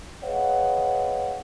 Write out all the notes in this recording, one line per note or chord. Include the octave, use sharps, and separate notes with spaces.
G#4 B4 C#5 D#5 F5 F#5